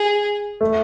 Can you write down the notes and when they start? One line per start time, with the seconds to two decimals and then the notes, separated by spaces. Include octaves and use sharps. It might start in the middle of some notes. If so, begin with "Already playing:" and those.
Already playing: G#4
0.61 A3